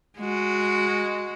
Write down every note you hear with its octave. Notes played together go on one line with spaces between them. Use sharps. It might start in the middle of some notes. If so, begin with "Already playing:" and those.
G#3 F#4